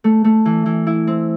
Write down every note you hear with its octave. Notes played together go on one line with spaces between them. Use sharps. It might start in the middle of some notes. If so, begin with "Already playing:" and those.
A3
A3
E3
E3
E4
C4